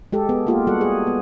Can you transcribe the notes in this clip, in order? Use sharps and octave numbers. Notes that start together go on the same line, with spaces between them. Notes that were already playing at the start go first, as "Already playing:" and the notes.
G#3 G4 A4
B3 G#4
A#3 F4 G4
G3 F#4 A4 F#5
G#4
B3